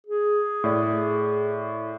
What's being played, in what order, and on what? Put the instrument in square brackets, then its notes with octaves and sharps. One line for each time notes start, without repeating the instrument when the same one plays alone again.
[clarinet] G#4
[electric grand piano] A2 D5